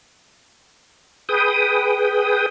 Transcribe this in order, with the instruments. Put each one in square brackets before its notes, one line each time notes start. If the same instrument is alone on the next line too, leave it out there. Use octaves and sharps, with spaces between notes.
[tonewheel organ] G#4 B4 G5 D#6